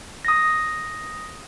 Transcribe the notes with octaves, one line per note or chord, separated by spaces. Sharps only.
D#6 A#6